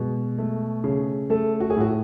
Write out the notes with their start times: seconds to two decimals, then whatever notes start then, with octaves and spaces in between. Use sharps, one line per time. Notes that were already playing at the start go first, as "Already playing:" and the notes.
Already playing: B2 G#3
0.38 A3
0.84 C#3
1.30 A3 A4
1.60 F#4
1.70 G#4
1.77 A2 F#4